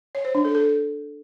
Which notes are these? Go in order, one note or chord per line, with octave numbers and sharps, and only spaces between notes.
C#5
C5
D4
A4
A4